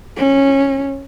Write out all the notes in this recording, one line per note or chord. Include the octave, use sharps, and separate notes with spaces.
C#4